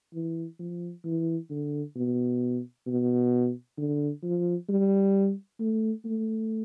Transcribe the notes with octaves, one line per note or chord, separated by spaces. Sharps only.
E3
F3
E3
D3
B2
B2
D3
F3
G3
A3
A3